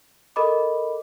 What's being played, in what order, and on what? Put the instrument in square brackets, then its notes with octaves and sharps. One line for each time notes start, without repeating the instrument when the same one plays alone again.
[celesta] A4 A#4 D#5 B5 D6